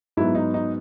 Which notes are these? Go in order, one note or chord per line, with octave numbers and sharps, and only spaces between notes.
G#2 F#3 B3 E4
D#4
D#4